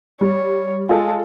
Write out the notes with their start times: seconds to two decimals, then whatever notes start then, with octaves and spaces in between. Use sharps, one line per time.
0.21 G3 C#5
0.89 G#3 F4 A4